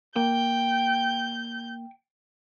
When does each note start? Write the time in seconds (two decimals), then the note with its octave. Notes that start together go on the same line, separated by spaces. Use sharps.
0.16 A#3 G5 G6